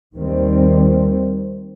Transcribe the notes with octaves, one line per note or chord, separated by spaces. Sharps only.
D#2 D#3 G3 C4